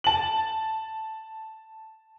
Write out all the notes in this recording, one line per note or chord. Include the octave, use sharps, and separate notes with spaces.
A5 F#7